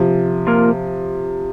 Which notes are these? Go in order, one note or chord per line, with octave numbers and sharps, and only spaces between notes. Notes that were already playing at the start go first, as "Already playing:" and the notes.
Already playing: C3 F3
A#3 F4 A#4